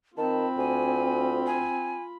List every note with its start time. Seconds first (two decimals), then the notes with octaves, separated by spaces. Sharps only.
0.18 D#3 C4 F4 A5 B5
0.58 D2 G#5
1.46 G#5